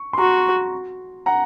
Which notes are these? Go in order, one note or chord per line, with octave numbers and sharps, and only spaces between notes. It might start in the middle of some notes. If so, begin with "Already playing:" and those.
Already playing: C#6
C6
F#4 A#5 C#6
F#5 A#5